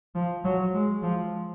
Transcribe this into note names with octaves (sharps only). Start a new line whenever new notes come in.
F3
F#3
G#3
F3